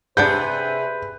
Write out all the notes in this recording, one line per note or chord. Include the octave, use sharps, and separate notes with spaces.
C3 D4 G#4 B4 F#5 B5 G6